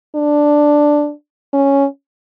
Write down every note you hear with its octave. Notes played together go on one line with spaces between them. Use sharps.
D4
C#4